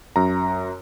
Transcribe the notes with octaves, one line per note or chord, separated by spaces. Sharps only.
F#2 A#5